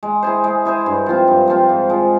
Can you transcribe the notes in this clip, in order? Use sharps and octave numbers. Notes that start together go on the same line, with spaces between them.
G#3
E4 G#4 C5
G#3
E4 G#4 C5
G2
F3 C4 F4
G2
F3 C4 F4
G#2
F3 G#3